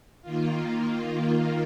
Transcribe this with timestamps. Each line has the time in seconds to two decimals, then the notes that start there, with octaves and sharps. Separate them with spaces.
0.22 D#3 A#3 F4